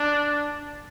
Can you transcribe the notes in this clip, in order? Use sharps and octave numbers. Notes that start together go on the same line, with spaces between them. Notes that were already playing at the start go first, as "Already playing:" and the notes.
Already playing: D4